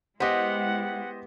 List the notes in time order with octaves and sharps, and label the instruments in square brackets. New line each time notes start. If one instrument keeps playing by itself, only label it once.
[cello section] G#3 E4 [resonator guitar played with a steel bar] B3 G4 [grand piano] C5 D#5 [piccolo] F#5